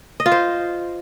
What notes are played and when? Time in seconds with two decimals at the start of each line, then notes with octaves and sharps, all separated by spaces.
0.20 D#5
0.26 F4
0.32 C5